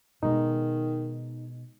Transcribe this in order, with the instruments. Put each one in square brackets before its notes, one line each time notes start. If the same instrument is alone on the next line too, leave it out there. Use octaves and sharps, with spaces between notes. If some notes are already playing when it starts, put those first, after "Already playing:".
[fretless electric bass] B2 G#3 [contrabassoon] D#3 [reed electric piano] D#4